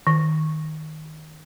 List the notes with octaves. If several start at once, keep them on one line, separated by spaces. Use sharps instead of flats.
D#3